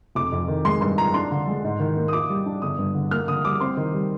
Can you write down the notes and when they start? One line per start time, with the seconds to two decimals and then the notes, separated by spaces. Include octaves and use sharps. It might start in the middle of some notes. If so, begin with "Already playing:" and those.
0.15 F1 D6
0.32 F2
0.48 D#3
0.65 G#3 C6
0.81 G2 C6
0.98 F3 A#5
1.14 D4 C6
1.31 D3
1.48 G#3
1.64 G#2
1.80 D#3
1.97 A#3
2.08 D#6
2.13 F4 D6
2.30 G3
2.46 D4
2.62 G1 D#6
2.78 G2
2.95 D3
3.11 A#3 F6
3.28 D3 D#6
3.45 G3 D6
3.60 C4 C6
3.77 D#3
3.94 G3